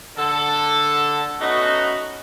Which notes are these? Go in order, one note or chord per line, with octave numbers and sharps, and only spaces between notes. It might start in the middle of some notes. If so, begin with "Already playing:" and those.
D3 A4
A3 B3 C#4 D#4 F#4